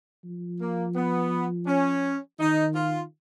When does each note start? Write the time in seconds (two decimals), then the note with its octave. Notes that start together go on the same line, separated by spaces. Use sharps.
0.25 F3
0.61 A#3
0.96 B3
1.67 C#4
2.40 D#3 D#4
2.75 F4